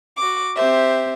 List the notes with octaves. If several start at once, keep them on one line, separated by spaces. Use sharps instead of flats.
F#4 D6
C4 G4 C5 E5